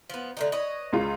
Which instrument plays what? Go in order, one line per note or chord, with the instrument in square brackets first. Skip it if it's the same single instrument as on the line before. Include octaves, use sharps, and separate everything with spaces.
[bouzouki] F3 B3
D3 A3 D#4
B4 C#5 D#5
[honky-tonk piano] C#2 G#3 F4